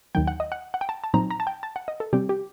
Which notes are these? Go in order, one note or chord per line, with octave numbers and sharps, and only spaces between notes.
D#2 D#3 F#3 G5
F#5
D#5
F#5
F#5
G5
A5
A5
A#2 F#3 C4 D#4 A#5
A#5
A5
G5
A5
F#5
D#5
A4
C3 G3 C4 G4
G4